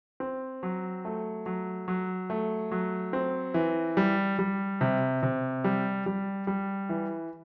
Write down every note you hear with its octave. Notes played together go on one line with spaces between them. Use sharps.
C4
F#3
A3
F#3
F#3
A3
F#3
C4
E3
G3
G3
C3
C3
G3
G3
G3
E3